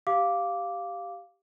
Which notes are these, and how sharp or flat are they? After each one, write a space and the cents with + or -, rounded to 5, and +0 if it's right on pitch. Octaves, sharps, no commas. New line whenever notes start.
G4 +0 F5 +0 D6 -5